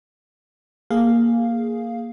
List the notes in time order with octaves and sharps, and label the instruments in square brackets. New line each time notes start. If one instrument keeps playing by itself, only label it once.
[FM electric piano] A#3 G#4 F5